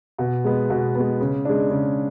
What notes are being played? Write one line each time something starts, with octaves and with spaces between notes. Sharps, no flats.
B2
G#3 B3
B2
G#3 B3
C#3
G#3 D4
C#3